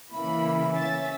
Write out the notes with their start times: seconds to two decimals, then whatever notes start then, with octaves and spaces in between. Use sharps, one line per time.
0.12 C#3 E3 A#3 E4 B5
0.71 C#4 E5 A6